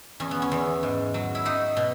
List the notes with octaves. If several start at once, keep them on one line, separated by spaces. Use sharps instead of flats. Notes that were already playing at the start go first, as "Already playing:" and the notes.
E2 C#4
B3
C#4
E2
G#2
F#3
E4
F#3 D#4
B2